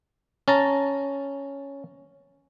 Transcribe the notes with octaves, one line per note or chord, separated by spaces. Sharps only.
C#4 A5 A#5